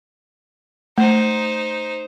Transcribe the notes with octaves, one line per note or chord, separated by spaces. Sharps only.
A3 D#4 C5